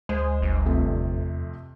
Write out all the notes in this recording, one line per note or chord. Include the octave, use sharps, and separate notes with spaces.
D2 G#3 C5
G1
F2 C3 A3
E2